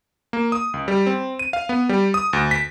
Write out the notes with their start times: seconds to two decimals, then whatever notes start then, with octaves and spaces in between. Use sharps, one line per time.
0.33 A#3
0.52 D#6
0.74 C#2
0.88 G3
1.07 C4
1.39 D#7
1.53 F5
1.69 B3
1.89 G3
2.14 D#6
2.33 D2
2.51 B6